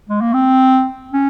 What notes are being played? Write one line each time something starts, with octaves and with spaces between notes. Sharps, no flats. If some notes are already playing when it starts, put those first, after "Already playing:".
G#3
A#3
C4
C#4